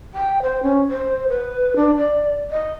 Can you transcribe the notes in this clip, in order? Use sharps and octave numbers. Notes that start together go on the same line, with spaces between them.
G5
C5
C#4
C5
B4
D4
D5
D#5